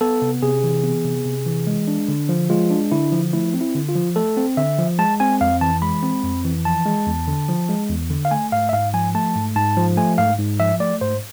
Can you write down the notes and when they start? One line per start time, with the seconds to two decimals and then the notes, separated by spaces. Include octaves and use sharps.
0.01 B3 A4
0.22 C3
0.42 C3 G#4
0.64 E3
0.84 B3
1.05 C3
1.25 C3
1.46 E3
1.67 G#3
1.88 D4
2.08 D3
2.29 F3
2.50 G#3 F4
2.71 D4
2.91 D3 E4
3.12 F3
3.33 A3 E4
3.54 C4
3.61 E4
3.75 D3
3.89 F4
3.95 F3
4.16 A3 A4
4.37 C4
4.57 D3 E5
4.78 F3
4.99 G#3 A5
5.20 C4 G#5
5.41 F2 F5
5.61 E3 A5
5.82 G#3 B5
6.03 C4
6.24 F2
6.45 E3
6.65 F3 A5
6.86 G#3
7.07 E2
7.28 D3
7.49 F3
7.69 G#3
7.90 E2
8.11 D3
8.25 F5
8.31 A3 G#5
8.52 G#2 F5
8.69 E5
8.73 G#2 F5
8.94 F3 G#5
9.15 A3 A5
9.35 G#2
9.56 G#2 A5
9.77 F3
9.97 A3 G#5
10.18 G#2 F5
10.39 G#2
10.60 F3 E5
10.80 A3 D5
11.01 G#2 C5